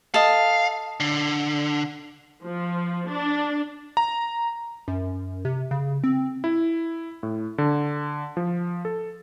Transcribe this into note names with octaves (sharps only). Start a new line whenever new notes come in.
A4 D#5 F5
D3
F3
D4
A#5
F#2
C3
C#3
C4
E4
A2
D3
F3
A4